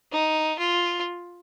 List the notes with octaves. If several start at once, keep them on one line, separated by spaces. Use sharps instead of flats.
D#4
F4